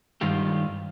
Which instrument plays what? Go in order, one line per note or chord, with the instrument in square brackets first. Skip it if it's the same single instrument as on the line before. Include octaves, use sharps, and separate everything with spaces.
[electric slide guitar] G2 D#3 F4 G4